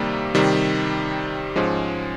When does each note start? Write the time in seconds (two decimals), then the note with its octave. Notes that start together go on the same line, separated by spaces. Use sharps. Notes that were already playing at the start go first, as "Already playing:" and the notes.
Already playing: C3 D#3 G3 A#3
0.35 C3 D#3 G3
1.56 G#2 F3 G#3 C#4